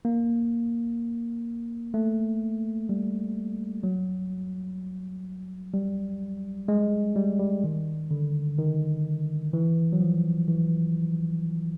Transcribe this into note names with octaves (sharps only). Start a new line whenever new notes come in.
A#3
A3
G3
F#3
G3
G#3
G3
G3
D#3
D3
D#3
E3
F#3
F3
E3